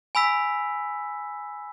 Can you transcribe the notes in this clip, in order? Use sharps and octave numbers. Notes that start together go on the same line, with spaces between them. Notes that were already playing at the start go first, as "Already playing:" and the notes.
G#5 B5 E6 B6